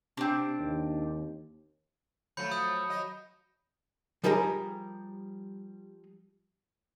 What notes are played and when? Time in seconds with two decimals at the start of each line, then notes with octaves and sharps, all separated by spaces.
0.17 C3 C4 D4
0.59 D#2
2.37 F3 F#3 A3 B5 G6 C#7
2.51 D#6 G6
2.89 F#3 D#5
4.24 F3 G3 G#4 A#4 C#5 A#5